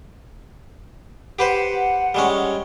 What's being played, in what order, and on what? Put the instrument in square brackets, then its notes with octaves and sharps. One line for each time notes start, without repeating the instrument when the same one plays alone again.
[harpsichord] G4 B4 C5 [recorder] F#5
[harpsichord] G3 G#3 C#4